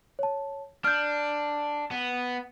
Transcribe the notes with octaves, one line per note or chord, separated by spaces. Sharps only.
C#5 A5
D4 F6 G6
B3